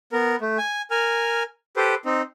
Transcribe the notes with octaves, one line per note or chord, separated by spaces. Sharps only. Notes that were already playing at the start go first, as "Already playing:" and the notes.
B3 A#4
A3
G#5
A#4 G#5 F6
G4 A4 B4 C5
C4 D#4